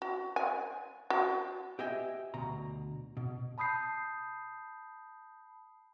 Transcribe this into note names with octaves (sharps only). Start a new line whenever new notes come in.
F#4
G#5
F#4
G4 D#5 E5 G5 G#5
D2 B2 A#5
B2
A5 B5 D#6 G6 C7